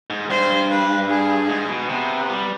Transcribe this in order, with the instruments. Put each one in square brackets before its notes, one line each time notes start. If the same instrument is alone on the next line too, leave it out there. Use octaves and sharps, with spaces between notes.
[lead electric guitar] G#2
[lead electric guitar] G2 [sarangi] C5
[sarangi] B4
G#4
[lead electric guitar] G#2
B2
[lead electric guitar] C3 [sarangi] B3
[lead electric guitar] G3